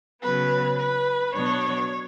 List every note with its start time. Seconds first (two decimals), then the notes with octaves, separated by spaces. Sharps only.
0.22 C#3 F#3 B3 B4
0.78 B4
1.34 B2 F#3 B3 D4 C#5